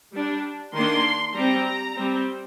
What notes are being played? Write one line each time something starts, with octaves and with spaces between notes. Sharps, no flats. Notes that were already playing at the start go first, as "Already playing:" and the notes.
G3 D4
D#3 A#3 D4 C6
G3 C4 A#5
G3 C4